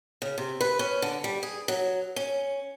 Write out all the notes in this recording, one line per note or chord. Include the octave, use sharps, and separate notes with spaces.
C#3
C3
B4
C#4
D3
G3
G#4
F#3
C#4